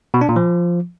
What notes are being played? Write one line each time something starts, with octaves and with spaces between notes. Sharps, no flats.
B2
D4
A#2
F3